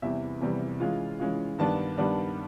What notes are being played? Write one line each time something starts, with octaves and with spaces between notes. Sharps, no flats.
E2 C3 E3 G3 B3 E5
E2 C3 E3 G3 B3
E3 G#3 C#4 F4 F5
E3 G#3 C#4 F4
G2 D#3 G3 B3 D4 A5
G2 D#3 G3 B3 D4